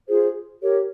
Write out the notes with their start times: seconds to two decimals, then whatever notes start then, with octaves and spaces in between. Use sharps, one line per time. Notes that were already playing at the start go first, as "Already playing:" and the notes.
0.08 F4 G#4 C5
0.61 G4 A#4 C#5